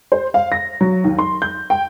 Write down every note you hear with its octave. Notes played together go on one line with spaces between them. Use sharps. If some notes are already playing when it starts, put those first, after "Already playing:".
C5
F5
A#6
F#3
D#2
C6
G6
G5